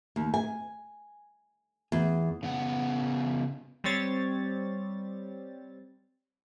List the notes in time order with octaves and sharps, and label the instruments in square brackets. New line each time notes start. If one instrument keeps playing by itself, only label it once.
[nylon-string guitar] D#2
G#5
E2
[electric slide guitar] C#3 B3 F#5
[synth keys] G3 C4 C#5 A6